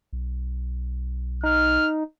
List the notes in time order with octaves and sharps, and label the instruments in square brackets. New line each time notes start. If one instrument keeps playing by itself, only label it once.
[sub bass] B1
[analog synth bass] D#4 [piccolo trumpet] F6